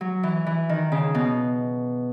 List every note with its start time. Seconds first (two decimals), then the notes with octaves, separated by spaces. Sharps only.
0.01 F#3
0.23 E3
0.47 E3
0.69 D#3
0.92 C#3
1.15 B2